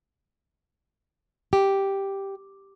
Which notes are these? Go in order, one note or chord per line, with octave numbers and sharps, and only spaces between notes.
G4